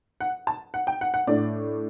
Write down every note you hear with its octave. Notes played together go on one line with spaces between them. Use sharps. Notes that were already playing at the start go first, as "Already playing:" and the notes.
F#5
A5
F#5
G5
F#5
F#5
A2 A3 D4 D5